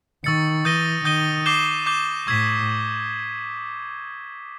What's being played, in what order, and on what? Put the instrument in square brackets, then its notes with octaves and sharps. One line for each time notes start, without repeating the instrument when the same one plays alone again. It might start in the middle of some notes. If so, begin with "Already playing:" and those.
[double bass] D#3 [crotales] C#6 E6 A6 C#7
[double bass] E3 [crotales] D#6 G6 A#6 D#7 G7
[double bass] D#3 [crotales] D#6 G6 A#6 D#7 G7
[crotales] D6 G6 C7 E7 G7
D6 G6 C7 E7 G7
[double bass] A2 [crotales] C#6 E6 G#6 B6 E7